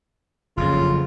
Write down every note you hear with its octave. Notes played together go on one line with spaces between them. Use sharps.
F#1 F2 C#3 F3 F4